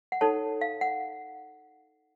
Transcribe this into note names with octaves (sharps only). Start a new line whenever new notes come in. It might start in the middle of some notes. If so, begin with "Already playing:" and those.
F#5
D#4 A4 C#5 A5
F5
F#5